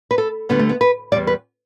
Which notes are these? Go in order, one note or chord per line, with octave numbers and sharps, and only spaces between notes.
B4
A4
D2 D3 G3 B3
A3
B3
B4
E2 B2 G3 D5
B4